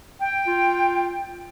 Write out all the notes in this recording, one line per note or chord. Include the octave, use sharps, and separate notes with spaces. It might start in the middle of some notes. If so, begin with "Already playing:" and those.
G5
F4